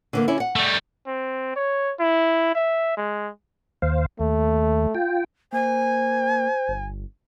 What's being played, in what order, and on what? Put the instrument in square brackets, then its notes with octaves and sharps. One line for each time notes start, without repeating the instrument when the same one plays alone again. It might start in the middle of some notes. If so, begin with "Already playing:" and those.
[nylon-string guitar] D3 E3 A#3
D3 C#4 E4
F#5
[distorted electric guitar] G3 A3
[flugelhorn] C4
C#5
E4
E5
G#3
[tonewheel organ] D#2 C5 F5
[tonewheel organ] D#2 [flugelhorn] A3
[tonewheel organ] F4 G5
[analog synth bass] A#3 [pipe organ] C5 [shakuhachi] G#5
[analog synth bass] G1